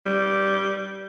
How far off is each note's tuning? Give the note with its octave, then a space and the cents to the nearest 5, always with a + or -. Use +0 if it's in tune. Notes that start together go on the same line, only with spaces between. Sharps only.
G3 -10